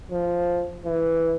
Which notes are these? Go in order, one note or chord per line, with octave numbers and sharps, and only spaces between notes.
F3
E3